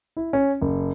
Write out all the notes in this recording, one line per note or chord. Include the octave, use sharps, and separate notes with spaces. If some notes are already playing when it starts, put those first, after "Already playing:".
E4
C#4
F#1